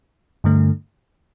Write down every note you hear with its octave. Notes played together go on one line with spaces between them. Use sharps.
G2 D3 A3